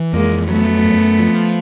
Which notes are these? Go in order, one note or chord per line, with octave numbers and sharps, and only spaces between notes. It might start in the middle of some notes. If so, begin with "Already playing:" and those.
Already playing: E3
F2 G#3 A#3
F#3 A3 B3
F#2
F3